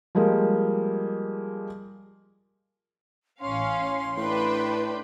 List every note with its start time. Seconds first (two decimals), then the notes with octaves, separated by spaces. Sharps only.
0.15 F3 G3 G#3 A#3
3.41 A1 C#4 F5 C6
4.17 A2 D4 B4 G5